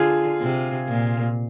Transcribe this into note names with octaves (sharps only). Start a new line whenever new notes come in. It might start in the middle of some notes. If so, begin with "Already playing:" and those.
Already playing: D3 F4 G#4
C3
A#2